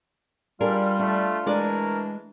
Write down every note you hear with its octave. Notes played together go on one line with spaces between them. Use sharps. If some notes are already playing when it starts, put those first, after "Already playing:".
G3 D4 F4 G#4 A#4
A3 D4
E3 G#3 A3 D4 A#4 D5